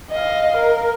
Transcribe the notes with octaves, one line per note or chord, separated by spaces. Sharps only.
D#5 F5
A#4